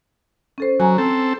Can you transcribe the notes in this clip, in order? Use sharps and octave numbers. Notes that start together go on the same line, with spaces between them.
C#4 A4 C5
F#3 G#5 A#5
C4 A4